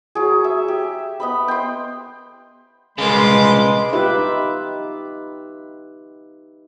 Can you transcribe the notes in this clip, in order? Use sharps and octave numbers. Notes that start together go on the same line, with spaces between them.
F#3 G#4
E5
G4
B3 D#5 B5
G5 C6
C2 C#3 G#3 B4 C6 D6
D#4 F4 G4 B4 E5